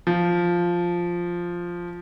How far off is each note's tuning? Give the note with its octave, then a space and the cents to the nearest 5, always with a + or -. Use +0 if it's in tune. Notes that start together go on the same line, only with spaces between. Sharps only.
F3 +0